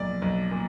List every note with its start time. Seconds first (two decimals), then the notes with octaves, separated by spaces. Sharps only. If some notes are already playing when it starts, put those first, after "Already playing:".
Already playing: B1 A#2 F3 D5
0.22 B1
0.51 A#2